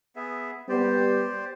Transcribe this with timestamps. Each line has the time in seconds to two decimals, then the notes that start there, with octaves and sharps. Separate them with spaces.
0.16 B3 G#4 E5
0.69 G3 B3 G4 C5 D5